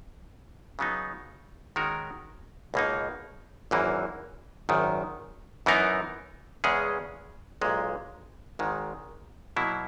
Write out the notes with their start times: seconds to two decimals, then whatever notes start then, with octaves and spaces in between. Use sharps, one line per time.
0.79 C#3 F#3 B3 D#4
1.76 D#3 G#3 C#4 F#4 A#4
2.74 C#2 B2 A#3 D#4
3.71 G#1 F#2 E3 A#3
4.69 G#1 F#2 D#3
5.66 F#2 E3 B3 D#4 A#4
6.64 E2 C#3 G#3 C#4 G#4
7.61 B1 A#2 G#3
8.59 G#1 G#2 D#3 G#3
9.56 B2 F#3 A#3 E4